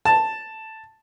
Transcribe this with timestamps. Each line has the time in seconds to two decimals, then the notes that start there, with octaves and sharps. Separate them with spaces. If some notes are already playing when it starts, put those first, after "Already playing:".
0.05 A5